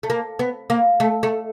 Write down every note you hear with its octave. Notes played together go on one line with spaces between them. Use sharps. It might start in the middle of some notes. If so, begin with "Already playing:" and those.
A3
A#3
B3
A#3
A3
A3